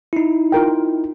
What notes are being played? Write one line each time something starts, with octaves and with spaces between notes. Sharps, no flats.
D#4 E4
F4 A#4 G5